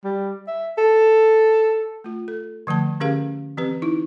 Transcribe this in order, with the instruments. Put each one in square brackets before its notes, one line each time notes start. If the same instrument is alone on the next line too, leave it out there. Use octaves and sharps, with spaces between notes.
[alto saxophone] G3
E5
A4
[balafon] A3 F4
A4
D3 F3 A3 A5
D3 C#4 G4 G#4 A#4 F5
E3 C4 G4 B4
D#4 E4